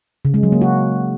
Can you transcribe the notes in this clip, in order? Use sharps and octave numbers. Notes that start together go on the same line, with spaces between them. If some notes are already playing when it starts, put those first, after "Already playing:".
C#3
G#3
F#3
A#3
F#4